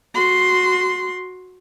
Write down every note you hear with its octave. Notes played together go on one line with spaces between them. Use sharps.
F#4 C6